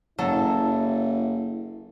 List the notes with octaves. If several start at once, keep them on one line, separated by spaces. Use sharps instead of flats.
F#1 F#3 E4 A4